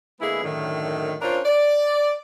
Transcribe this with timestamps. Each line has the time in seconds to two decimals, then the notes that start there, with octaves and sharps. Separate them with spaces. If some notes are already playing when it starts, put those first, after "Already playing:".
0.19 D3 G#3 A#3 B3 E4 G#4
0.42 F#2 A2 D3 D#3
1.21 C#4 D4 F4 A#4 C5 C#5
1.45 D5